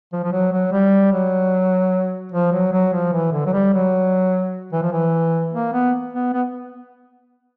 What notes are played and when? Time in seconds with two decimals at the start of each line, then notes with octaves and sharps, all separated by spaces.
0.13 F3
0.24 F3
0.32 F#3
0.53 F#3
0.72 G3
1.12 F#3
2.32 F3
2.52 F#3
2.73 F#3
2.93 F3
3.13 E3
3.32 D3
3.46 F#3
3.53 G3
3.73 F#3
4.72 E3
4.83 F3
4.92 E3
5.53 A#3
5.73 B3
6.13 B3
6.33 B3